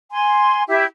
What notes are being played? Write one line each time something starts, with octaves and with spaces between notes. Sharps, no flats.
G#5 C6
E4 G4 E5